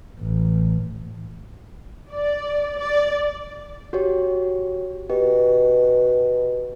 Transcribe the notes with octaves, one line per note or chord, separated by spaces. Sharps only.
A1
D5
D5
F#4 G4 C#5
B2 G4